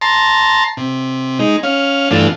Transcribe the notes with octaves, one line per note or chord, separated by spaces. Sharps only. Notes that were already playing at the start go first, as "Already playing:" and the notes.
A5 A#5 C6
C3
G#3 D#4
C#4 F5
G2 E3 A3 D4 F4